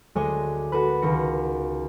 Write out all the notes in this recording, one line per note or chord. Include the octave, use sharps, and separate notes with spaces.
D2 G#3 D4 C#5 D#5 G#5
F#4 A4 B4
C#2 D#3 A#6 C#7